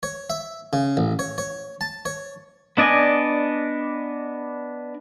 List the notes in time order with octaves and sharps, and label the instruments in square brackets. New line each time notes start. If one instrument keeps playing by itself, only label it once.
[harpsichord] C#5
E5
C#3
A1
C#5
C#5
A5
C#5
[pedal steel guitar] B3 D4 D5 D#5 G#5